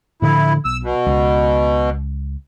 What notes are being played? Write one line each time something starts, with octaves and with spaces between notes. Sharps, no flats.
A2 D3 F3 E4
B1 E6
B2
C#2